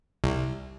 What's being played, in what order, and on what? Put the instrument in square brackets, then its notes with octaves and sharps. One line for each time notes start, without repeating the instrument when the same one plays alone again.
[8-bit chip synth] C2